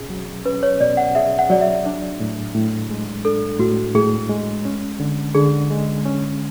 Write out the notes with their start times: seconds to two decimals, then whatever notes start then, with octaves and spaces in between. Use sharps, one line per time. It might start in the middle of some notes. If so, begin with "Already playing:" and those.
Already playing: B2 C#4 G#4
0.10 F#3
0.45 C#4 B4
0.63 C#5
0.80 B2 D5
0.97 F#5
1.15 G#4 E5
1.39 F#5
1.50 F#3 D5
1.61 E5
1.86 D4
2.20 A2
2.55 A2
2.91 G#3
3.25 D4 A4
3.59 A2 F#4
3.94 A2 G#4
4.30 G#3
4.65 C#4
5.00 D3
5.35 D3 G#4
5.70 G#3
6.05 C#4